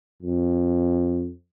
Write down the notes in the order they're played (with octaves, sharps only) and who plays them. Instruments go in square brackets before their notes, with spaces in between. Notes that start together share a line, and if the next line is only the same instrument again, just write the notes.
[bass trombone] F2